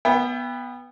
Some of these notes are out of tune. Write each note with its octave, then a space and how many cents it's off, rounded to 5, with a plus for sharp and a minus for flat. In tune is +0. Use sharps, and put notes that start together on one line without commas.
B3 -5 E5 +30 G5 +30